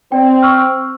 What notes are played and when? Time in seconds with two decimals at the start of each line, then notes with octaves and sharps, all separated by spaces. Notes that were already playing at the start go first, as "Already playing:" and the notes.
0.12 C4 D5 G5
0.42 C#6 E6 F6